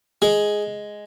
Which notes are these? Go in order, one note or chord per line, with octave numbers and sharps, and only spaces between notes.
G#3 G#4